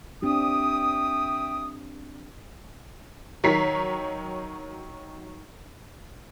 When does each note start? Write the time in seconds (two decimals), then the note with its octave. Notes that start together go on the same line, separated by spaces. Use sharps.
0.22 C4 D4 G4 E5 G5 D#6
3.44 D#3 F#3 C#5 A#5 B6 C7